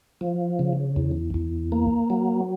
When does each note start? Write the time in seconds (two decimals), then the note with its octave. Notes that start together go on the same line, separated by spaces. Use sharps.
0.21 F3
0.59 C#3
0.96 E2
1.34 E2
1.72 A#3
2.10 F#3